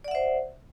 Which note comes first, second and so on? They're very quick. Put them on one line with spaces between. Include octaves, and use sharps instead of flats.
D5 F#5 E5 C5